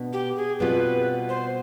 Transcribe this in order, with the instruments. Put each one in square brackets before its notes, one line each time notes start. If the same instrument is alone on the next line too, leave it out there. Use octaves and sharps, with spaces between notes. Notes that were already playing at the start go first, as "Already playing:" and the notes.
Already playing: [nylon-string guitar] B2 B3 D4
[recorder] G4
G#4
[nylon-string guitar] B2 G3 C4 F4 [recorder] B4
[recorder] C5